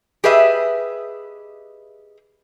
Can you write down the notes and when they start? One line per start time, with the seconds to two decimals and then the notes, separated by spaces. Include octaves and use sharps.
0.24 G4 G#4 B4 D#5 E5